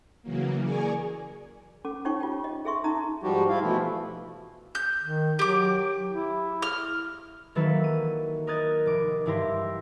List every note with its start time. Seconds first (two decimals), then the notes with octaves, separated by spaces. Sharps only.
0.23 C#3 E3 F#3 A#3
0.61 G#4 A#4 D5 G#5 C#6
1.85 C#4 A4 D6
2.05 C#4 D#4 F4 C#5 G5 C#6
2.21 F4 G4 C#5 G5
2.44 D#5
2.65 G#4 A4 E5 C6 C#6 D#6
2.84 C#4 D#4 A#5 D#6
3.23 G#2 F3 G3 F#4 G4
3.48 E4 F4 F5
3.61 B2 E3 F3 A3 E4
4.75 G6
5.03 D#3
5.39 F#3 G4 D6
6.11 E4
6.62 F6
7.55 D#3 E3 F#3 A#3 A4 B4
7.84 D#7
8.47 A#4 D#5 D#6 F#6 G#6 A6
8.86 F1 D6
9.26 G2 E3 E4 G4 C6 A#6